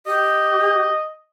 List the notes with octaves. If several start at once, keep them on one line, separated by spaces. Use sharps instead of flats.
G4 D#5